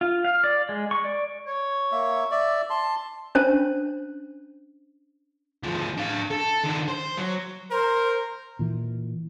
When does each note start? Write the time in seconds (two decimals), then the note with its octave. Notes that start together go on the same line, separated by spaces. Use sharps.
0.01 F4
0.25 F5
0.44 D5
0.69 G#3
0.91 C#6
1.04 D5
1.47 C#5
1.92 A#3 E5
2.31 D5 E5
2.70 A5 C6
3.35 C#4 D4 C5 A5
5.63 D2 F3
5.98 D4 F5
6.31 A4
6.64 D#3 D4
6.88 C5
7.18 F#3
7.71 A#4 C5
8.59 A#2 E3